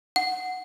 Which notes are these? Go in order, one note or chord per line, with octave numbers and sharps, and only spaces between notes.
F#5